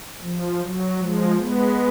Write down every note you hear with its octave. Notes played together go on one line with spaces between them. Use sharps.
F3
F#3
F3 G#3
G#3 B3